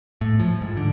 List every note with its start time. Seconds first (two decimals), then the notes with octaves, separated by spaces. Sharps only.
0.21 A2
0.40 F3
0.62 G#2
0.77 D3